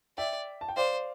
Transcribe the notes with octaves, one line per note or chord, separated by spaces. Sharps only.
D5 E5 G5
A5
G5
C5 D5 F5